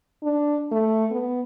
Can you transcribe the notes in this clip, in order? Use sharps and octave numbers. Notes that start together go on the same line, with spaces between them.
D4
A3
B3